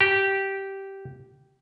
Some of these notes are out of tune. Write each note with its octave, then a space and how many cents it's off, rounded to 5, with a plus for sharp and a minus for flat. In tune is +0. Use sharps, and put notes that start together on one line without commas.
G4 -10